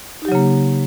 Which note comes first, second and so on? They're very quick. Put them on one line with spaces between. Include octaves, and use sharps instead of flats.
D#4 G4 F#3 C#3 A#3